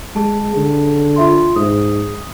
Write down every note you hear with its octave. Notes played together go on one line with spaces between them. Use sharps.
G#3 G#4 A5
D3
F4 E5 C6
G#2 D#6